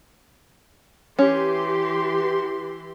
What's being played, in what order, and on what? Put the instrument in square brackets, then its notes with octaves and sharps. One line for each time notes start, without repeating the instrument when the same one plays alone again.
[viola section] E3 G4 C6 [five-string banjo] C#4